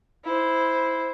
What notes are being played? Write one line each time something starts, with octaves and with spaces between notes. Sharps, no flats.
E4 C5